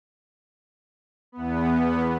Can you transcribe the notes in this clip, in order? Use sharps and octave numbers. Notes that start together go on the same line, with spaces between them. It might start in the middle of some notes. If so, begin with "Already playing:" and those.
E2 B3